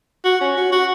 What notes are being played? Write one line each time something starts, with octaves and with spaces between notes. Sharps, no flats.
F#4
C#4
F#4
F#4